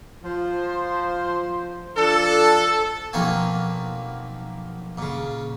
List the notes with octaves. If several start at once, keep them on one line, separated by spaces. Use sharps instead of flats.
F3 C5
F3 D4 A4
B1 F3 A#3 C4 F#4 G#5
A#2 C#3